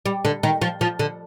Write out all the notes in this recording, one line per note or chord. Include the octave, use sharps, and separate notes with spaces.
G3
D3
D#3
F3
F3
D3